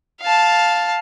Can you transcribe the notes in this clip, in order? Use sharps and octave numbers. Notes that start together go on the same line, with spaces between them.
F5 A5